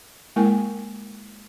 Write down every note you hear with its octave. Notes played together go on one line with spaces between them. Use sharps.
G#3 A#3 E4 A#4 G5 G#5